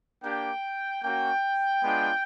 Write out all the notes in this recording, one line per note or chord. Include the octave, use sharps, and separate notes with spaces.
A#3 D4 G4 G5
A#3 C#4 F#4 G5
G#3 B3 D4 F4